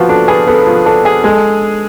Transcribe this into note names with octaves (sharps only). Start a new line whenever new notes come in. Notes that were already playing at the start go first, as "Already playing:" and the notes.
Already playing: F3 B3 F4 F#4
D4 A4
G#4 B4
B3 A4
F3
D4 A4
G#4
G#3 A4